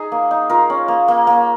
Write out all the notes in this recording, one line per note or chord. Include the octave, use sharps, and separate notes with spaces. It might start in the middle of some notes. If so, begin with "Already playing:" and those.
Already playing: D#4 G#4
A#3
D#4
F4 A#4
C#4
A#3
A#3
A#3